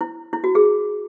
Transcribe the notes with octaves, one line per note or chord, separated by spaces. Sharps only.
E4
E4
F#4
G#4